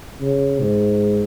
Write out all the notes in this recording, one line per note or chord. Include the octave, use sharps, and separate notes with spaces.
C#3
G#2